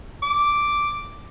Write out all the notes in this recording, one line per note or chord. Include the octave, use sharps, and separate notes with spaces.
D6